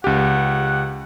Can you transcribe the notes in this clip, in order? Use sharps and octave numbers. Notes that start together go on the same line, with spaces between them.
C#2 G4 F#5